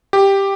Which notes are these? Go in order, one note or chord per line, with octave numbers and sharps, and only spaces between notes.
G4